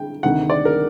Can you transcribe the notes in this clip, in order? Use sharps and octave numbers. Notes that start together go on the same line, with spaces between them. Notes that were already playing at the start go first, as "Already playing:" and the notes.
Already playing: D3 G5
D2 C3 D#3 F#5
D5
A#4